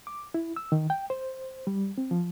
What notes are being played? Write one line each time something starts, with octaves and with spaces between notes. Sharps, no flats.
D6
E4
E6
D#3
G5
C5
G3
C4
F3